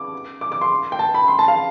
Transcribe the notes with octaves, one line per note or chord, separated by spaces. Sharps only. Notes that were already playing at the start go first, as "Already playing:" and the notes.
Already playing: D6
D6
D6
C6
G5
A5
B5
C6
A5
F5